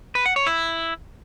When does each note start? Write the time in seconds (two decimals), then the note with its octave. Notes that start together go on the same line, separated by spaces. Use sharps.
0.15 B4
0.26 F#5
0.36 C#5
0.47 E4